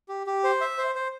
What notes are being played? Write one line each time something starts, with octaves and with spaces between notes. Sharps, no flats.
G4
G4
C5
E5
C5
C5